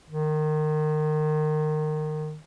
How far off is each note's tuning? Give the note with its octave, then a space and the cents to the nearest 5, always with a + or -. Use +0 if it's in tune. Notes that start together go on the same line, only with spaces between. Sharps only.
D#3 -25